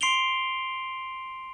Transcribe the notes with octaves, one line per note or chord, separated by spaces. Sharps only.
C6 C7 D7 F7 G7